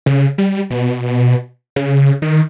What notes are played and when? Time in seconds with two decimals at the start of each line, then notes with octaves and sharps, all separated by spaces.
0.06 C#3
0.38 G3
0.70 B2
1.76 C#3
2.22 D#3